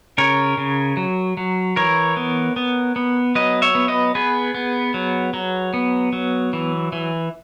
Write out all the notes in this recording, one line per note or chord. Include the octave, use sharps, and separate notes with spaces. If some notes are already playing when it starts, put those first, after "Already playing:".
C#3 A#4 C#5
C#3
F#3
F#3
E3 A#4 C#5
B3
B3
B3
F#3 B4 D#5
C#5 E5
B3
B4 D#5
B3 G#4 B4
B3
F#3
F#3
B3
F#3
E3
E3